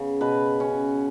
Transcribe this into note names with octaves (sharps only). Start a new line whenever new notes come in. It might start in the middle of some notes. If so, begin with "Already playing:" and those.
Already playing: C#3 B3
B2 B4
C#4